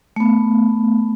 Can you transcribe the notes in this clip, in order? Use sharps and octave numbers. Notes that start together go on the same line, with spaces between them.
A3 B3